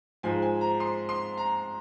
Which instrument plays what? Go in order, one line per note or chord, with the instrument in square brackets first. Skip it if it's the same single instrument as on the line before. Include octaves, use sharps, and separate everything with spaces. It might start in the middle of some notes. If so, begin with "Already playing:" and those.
[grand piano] G#2 F3 G#3 G#5
G#5
A#5
C6
C6
A#5